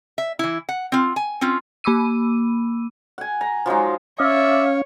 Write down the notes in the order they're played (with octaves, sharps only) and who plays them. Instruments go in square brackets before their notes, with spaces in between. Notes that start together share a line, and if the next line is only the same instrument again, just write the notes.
[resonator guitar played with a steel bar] E5
E3 E4
F#5
C4 F4
G#5
C4 C#4 F4
[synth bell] A#3 B5 D6 E6 D#7
[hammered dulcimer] F#5 G#5
A#5
F3 F#3 G#3 D#4
[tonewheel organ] C#4 F5 [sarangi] C#5 [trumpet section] D5 E5